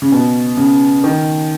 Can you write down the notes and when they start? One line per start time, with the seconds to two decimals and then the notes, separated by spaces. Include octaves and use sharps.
0.02 C#3
0.12 B2
0.57 C#3
1.04 D#3